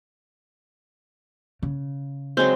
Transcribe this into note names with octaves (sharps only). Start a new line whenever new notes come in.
C#3
F#3 G#3 C4